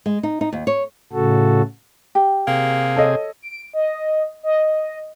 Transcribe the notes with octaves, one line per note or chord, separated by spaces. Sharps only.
G#3
D#4
D#4
D#2
C#5
A2 C#3 F#4 A4
G4
C3 A#3 G#4
A4 C#5 D#5
D7
D#5
D#5